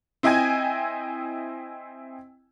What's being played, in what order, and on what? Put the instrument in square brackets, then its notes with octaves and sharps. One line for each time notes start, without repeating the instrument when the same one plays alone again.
[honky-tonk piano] C4 E4 D#5 G5 G#5 G#6